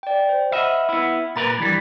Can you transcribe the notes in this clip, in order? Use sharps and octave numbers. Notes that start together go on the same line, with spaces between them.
D5 G5
C5
D#5 E5 F#5 B5 F6
B3 E4
A#2 A#4 B4 B5 A6
G2 E3 G3